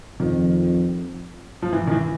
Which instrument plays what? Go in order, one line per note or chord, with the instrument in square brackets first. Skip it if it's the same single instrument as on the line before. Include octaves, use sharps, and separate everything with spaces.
[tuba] F2 [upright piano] D#3
[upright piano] F3
E3
D#3
E3